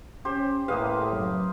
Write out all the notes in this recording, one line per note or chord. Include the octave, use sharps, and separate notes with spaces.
C#4 G4 C5
A2 A#3 G#4 B4 D#5 F5
F#1 B4